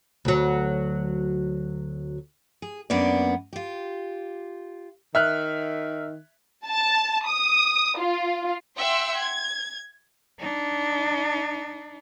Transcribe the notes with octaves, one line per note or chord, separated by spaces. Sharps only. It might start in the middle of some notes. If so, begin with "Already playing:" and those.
D2 F#3
G#4
F#2 A#3 B3 D4 D5
F4 G4
D#3 E5 F6 F#6
A5
D#6
F4
E5 F#5 G5 C6 E6
G#6
D4 D#4